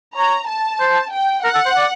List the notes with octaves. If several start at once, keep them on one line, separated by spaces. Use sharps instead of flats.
C#5 A#5
A5
C5
G5
A#4 F#5
A4
C5
D5